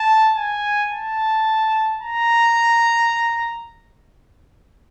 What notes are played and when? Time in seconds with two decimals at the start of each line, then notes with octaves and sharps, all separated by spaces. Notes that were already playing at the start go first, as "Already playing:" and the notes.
Already playing: A5
0.36 G#5
0.91 A5
2.02 A#5